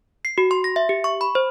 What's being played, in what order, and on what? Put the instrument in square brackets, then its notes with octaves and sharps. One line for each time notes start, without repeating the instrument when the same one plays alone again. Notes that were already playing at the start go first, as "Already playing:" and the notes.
[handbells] C7
F#4
C6
A#6
E5
G4
C#6
B5
C5